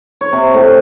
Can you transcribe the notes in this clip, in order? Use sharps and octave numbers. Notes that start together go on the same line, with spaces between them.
C#5
C3
A2